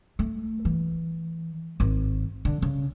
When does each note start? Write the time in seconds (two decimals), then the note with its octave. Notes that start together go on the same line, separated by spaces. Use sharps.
0.19 A3
0.65 E3
1.80 G#1
2.45 D3
2.62 C#3